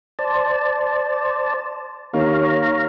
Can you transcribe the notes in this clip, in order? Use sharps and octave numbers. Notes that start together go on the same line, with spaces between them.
C5 D5 A5
D#2 C#5 F5 A#5